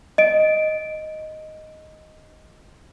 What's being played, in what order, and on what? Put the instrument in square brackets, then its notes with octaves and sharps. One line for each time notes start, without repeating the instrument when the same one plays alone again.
[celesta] D#5 D7